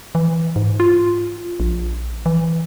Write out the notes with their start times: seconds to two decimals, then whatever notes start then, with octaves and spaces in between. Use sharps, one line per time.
0.15 E3
0.56 G#2
0.80 F4
1.60 A#1
2.26 E3